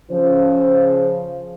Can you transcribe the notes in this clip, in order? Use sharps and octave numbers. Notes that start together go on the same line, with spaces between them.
C#3 F3 C5